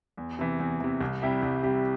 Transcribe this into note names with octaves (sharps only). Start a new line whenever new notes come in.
E2
C3 E3
E2
C3 E3
C2
C3 G3 E4 G4
C2
C3 G3 E4 G4